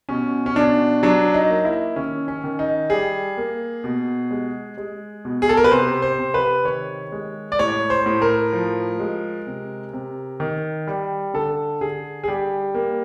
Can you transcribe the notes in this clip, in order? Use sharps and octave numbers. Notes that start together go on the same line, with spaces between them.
B2 C#4
C#4
B2 D4
F#3 D4
D#4
A#3
E4
D#3 C#4
C#4
D#3
D#4
G3 G#4
A#3
B2
G#3
G#3
B2
G#4
A4
A#4
B4
C3 C5
C5
C3
B4
D#3 C#5
G#3
D5
A2 C#5
C5
A2
A#4
F3
G#3
C3
C3
D#3
G3
D3 A4
D3 G#4
G#4
G3 G4
A#3